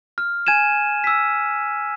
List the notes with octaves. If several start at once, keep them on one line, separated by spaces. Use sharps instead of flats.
F6
G#5 G#6 D#7 E7
E6 B6